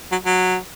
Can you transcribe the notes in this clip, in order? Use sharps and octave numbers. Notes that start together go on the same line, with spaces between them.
F#3
F#3